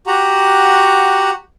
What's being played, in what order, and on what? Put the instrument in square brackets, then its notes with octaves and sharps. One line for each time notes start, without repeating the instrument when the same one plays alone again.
[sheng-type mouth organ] F#4 G4 F#5 A#5